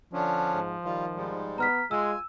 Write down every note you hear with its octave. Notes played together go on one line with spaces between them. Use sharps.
D3 F3 C#4 D4
G#2
D#3 G3 F4
G#2 G3 G#3
B3 A#5 F6 B6
G#3 F4 G#5 E6